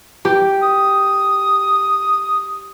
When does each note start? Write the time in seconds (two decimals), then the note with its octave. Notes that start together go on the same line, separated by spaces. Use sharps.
0.25 G4
0.63 D#6